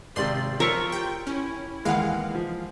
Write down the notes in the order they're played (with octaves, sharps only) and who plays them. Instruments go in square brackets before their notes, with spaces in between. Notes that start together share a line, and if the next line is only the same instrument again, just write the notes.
[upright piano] G#1 C3 [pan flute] D5 [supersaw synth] C6
[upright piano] F3 E6 B6 [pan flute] F4 [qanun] A#4 C#5 C#6
[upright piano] G4 [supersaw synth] G5
[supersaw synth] C#4 [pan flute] E4
[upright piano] D#2 E3 F#5 [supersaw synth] G#3 F5
[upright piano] F3